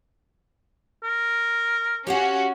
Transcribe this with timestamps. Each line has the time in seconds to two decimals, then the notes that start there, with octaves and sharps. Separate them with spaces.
1.04 A#4
2.07 C#4 F#4 G4 F5 F#5